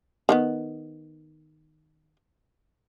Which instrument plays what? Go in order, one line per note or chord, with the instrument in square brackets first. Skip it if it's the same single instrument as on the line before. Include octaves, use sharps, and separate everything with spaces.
[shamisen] D#3 A#3 B3